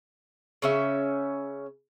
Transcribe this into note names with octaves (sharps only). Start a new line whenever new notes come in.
C#3 C#4 E5